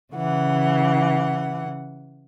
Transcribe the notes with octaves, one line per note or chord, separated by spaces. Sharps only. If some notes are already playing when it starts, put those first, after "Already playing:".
C#3 E3 F#5